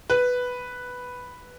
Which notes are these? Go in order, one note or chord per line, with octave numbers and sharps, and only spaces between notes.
B4